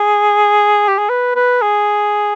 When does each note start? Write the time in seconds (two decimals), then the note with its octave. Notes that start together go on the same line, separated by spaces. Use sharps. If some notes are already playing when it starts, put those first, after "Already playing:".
Already playing: G#4
0.88 G4
0.98 G#4
1.09 B4
1.35 B4
1.62 G#4